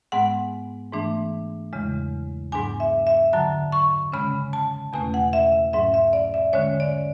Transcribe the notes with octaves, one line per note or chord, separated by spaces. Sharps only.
G#2 G#3 B3 F#5
G#2 E3 A3 D4
E2 C#3 G#3
G#2 F#3 B3 D4 G#5
E5
E5
F#2 D3 F#3 A5
C#6
C#3 G#3 C#4 B5
A5
E2 B2 A3 C#4 G#5
F#5
E5
G#2 F#3 C#4 E5
E5
D5
E5
D3 G#3 C#4 C#5
D5